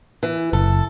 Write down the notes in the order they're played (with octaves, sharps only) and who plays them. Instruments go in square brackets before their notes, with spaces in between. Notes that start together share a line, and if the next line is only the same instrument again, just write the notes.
[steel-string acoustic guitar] E3
[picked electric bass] F#1 [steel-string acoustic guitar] A4